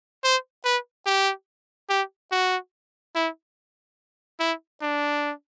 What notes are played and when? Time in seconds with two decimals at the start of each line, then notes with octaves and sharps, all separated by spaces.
0.24 C5
0.65 B4
1.06 G4
1.89 G4
2.32 F#4
3.15 E4
4.40 E4
4.82 D4